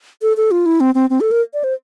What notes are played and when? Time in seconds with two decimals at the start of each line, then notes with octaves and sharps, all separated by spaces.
0.22 A4
0.37 A4
0.51 F4
0.66 E4
0.80 C4
0.95 C4
1.10 C4
1.21 A4
1.31 A#4
1.54 D5
1.64 C5